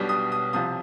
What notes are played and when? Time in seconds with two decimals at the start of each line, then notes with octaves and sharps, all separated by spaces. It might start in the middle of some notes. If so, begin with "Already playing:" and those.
Already playing: B1 B2 G3 B3 D4
0.09 D#6
0.32 D#6
0.53 C2 C3 F3 D#6